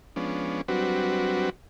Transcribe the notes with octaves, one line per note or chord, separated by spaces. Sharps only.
F3 G#3 B3 C#4 D4
F#3 G3 C4 D4 F#4 B4